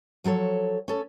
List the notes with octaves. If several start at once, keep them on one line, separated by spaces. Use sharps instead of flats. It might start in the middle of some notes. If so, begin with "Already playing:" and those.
F3 F#3 A4 C#5
C#4 A4